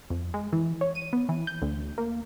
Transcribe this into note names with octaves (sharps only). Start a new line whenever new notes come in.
F2
G#3
E3
C#5
D#7
B3
E3
G6
D2
A#3